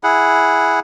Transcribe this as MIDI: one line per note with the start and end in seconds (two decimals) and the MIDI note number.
0.03 0.80 64
0.03 0.80 68
0.03 0.80 78